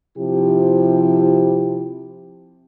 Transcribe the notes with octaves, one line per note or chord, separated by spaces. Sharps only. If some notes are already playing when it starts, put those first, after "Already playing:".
C3 F3 E4 G4